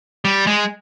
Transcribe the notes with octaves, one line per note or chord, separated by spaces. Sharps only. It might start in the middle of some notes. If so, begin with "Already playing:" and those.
G3
G#3